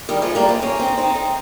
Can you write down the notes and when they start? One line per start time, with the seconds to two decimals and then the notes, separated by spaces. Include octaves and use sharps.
0.09 D#3 G3
0.22 F3 G#3
0.35 G3 A#3
0.49 G#3 C4
0.62 A#3 C#4
0.79 C4 D#4
0.98 C4 D#4
1.15 C4 D#4